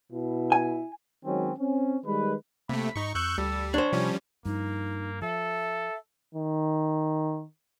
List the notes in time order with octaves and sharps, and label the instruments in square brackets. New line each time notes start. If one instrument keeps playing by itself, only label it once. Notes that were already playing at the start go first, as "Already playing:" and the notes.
[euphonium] B2 [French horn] E4
[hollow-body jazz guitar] G#5
[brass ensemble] D#3 F#3 G#3 C4 C#4
C4 C#4
D#3 G3 G#3 B4
[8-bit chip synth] C3 A3 [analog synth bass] A#3 [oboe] B5
[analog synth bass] G#2 [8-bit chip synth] D#4 C#6
[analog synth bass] F2 [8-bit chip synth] C#6 F#6 G6 [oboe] E6
[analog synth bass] D2 [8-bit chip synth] G3 [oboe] A4
[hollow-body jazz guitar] D4 C5 [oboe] C#5
[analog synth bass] C3 [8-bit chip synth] F3 G3 C#4
[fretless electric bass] G2 F3 [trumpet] A#3 [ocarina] D#4
[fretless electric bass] F3 [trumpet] A4 [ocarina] E5
[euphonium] D#3